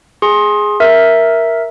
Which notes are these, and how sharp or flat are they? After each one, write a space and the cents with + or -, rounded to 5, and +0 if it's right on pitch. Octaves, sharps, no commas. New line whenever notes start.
G#4 +0 C6 +25
A#4 +5 E5 +0